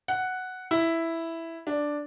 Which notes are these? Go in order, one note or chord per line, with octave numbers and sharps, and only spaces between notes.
F#5
E4
D4